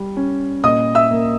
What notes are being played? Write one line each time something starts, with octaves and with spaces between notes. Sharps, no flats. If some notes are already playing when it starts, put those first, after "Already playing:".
Already playing: G3
C#4
A#2 D#5 D#6
E5 E6
A#3